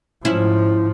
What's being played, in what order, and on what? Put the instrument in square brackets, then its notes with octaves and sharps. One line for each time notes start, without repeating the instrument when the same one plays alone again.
[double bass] G#2 F3 [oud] C#4 E4